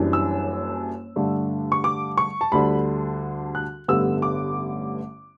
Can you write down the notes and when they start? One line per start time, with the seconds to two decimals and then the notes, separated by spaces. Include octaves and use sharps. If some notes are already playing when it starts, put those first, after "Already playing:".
Already playing: F#1 F#2 E3 G3 D4
0.13 E6
1.16 G2 D3 A3 D4
1.72 C#6
1.84 D6
2.17 C#6
2.41 A5
2.52 D2 D3 G3 D4 B5
3.55 F#6
3.88 A1 G2 D3 G3 B3 E6
4.22 D6